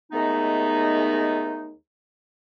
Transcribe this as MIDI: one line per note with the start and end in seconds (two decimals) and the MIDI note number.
0.12 1.73 39
0.12 1.73 56
0.12 1.73 57
0.12 1.73 59
0.12 1.73 63